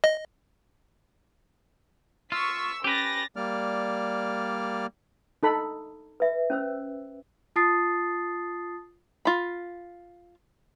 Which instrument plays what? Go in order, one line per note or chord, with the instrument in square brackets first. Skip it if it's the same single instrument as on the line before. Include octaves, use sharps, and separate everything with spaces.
[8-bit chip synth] D#5
[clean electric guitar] F4 [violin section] C#6 E6 B6
[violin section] C#4 A6 A#6 [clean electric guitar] G4 B4
[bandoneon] G3 A#3 D5 F6
[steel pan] D#4 A4 B5
[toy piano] B4 E5
C#4 C5 E6
[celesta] F4 A5 D#6 A6 C7
[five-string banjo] F4 B5